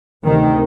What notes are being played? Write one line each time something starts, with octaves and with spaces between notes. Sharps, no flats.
D2 C3 D#3